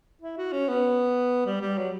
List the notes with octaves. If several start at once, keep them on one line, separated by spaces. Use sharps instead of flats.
E4
F#4
C#4
B3
G3
G3
F#3